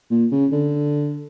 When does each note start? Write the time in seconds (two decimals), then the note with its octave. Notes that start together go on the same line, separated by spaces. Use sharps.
0.11 A#2
0.32 C#3
0.52 D3